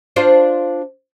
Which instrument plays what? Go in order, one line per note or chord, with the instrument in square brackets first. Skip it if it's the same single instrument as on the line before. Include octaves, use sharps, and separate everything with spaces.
[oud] D4 F4 C5